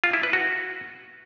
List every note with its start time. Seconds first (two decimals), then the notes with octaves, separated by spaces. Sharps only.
0.04 F4
0.13 E4
0.23 B4
0.33 F#4